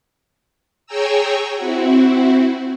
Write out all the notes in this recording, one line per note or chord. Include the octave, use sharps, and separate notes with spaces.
G#4 C#5 G5 G#5 A#5 E6
C4 E4 F#4